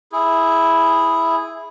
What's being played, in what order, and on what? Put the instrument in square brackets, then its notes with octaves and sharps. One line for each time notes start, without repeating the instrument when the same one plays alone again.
[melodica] E4 G#4